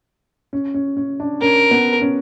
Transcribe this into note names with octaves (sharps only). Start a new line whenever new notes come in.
C#4
C#4
C#4
D4
C#4 A#4
B3
C#4